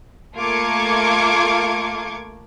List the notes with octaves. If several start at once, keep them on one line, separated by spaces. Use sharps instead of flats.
A3 A#3 F4 D6 G#6 C#7